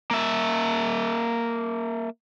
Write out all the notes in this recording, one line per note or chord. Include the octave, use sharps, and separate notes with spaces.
A#3 E5